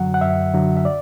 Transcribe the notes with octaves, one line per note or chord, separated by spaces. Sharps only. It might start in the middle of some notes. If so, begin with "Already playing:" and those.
Already playing: F#2 D3 F#3 F#5
F#5
F#2 E5
D3 F#3
E5
D5